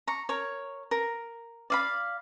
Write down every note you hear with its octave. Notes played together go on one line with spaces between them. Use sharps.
A#5 C#6
A#4 C#5
A#4
D5 F5 B5